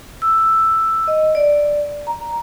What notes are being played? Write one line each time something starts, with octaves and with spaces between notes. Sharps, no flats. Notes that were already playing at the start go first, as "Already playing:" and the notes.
E6
D#5
D5
A#5